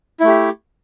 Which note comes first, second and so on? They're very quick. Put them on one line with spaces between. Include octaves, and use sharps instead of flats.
E4 A3 G4